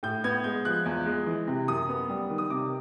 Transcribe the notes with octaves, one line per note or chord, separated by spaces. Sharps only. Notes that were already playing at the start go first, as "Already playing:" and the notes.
A2 G6
B3 G#6
G#3 G6
F3 F#6
E2
G#3
E3
C3
F#2 D#6
B3
G3
D#3
D#6
C3 D6